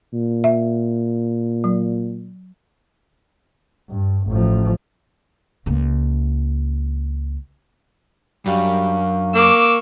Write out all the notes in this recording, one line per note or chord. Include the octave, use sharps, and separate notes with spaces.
A#2
E5
F#3
G2
A1 F3
C#2 A#3
F#2 G3 D4 F5 C#6
A#3 C#6 D6 E6